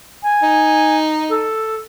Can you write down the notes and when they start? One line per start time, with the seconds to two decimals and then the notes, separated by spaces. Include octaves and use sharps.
0.23 G#5
0.43 D#4
1.29 A4